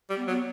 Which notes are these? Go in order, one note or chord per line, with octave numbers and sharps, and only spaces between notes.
G3
B3
F#3 B3